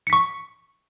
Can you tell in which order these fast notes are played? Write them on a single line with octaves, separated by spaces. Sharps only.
C#7 B6 C#6